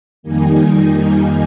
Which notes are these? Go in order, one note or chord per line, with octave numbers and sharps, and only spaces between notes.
F2 D#3 G3 A#3 D#4 G#5